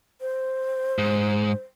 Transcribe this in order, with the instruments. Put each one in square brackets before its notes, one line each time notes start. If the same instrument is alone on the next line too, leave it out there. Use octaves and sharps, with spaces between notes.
[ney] C5
[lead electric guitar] G#2